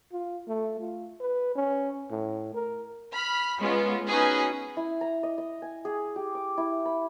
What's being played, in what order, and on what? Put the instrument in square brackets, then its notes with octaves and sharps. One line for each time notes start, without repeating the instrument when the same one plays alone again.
[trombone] F4
A3
F4
B4
C#4
A2
A#4
[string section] B5 F6
G#3 B3 C#4 F4
B3 C#4 D#4 F#4 G#4 B4
[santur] E4
A#5
D#5
D#5
G#5
G#4
G4
D6
E4
B5